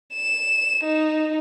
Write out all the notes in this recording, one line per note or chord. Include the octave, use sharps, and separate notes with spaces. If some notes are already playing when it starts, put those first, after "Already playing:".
E7
D#4